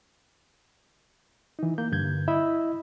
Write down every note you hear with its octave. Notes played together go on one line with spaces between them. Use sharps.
E3 D#4
A#3 G6
G2 D3 G6 G#6
E4 D#5 E5 B5 E6